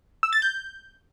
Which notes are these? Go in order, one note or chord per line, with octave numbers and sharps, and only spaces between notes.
E6
A6
G6